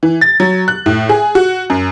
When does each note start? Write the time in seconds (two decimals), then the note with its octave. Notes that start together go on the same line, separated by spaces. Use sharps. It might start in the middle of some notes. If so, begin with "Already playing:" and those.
0.03 E3
0.21 A6
0.40 F#3
0.68 F#6
0.86 A2
1.09 G#4
1.35 F#4
1.70 F#2